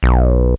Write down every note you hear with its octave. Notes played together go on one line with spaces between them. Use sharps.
B1